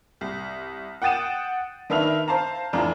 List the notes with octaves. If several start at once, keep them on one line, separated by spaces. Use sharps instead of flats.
C2
F#5 G5 D#6 A6 D#7 E7
D#3 D4 B4 E5 F6 F7
C5 F5 A5 A#5
F1 E3 D4 F4 A#5